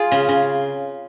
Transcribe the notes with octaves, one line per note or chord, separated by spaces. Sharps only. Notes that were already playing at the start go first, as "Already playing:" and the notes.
Already playing: F4 G#4
C#3
C#3